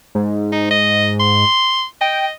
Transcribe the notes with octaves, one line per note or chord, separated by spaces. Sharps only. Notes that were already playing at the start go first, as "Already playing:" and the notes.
G#2
D#4
D#5
C6
D#5 G5